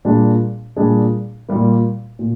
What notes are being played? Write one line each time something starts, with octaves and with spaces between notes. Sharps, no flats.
A#2 G3 D4 G#4
A#2 G3 D4 G#4
A#2 G3 A#3
A#2